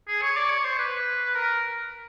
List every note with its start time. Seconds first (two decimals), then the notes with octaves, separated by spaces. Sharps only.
0.08 G#4
0.22 C#5
0.37 D5
0.50 C#5
0.64 C5
0.78 B4
1.35 A#4